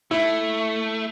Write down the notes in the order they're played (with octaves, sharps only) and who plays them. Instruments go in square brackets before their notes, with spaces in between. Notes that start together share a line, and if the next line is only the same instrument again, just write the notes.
[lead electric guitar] A3 [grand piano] E4